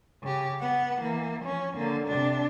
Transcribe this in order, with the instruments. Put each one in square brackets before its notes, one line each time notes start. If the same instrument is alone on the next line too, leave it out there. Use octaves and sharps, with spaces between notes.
[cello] C#3 G4
B3 F#5
E3 A#3
F3 C#4
D3 A#3
C3 D4